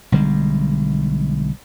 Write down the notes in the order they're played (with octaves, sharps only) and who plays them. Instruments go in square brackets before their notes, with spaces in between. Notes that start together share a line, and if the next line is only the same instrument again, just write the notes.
[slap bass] B1 D3 G3 G#3